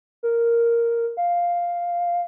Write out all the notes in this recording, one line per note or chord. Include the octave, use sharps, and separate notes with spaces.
A#4
F5